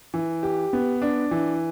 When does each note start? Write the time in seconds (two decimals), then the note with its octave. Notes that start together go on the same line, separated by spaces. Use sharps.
0.14 E3
0.43 G4
0.73 B3
1.02 D4
1.31 E3